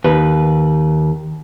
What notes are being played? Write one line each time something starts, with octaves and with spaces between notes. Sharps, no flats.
D#2 B4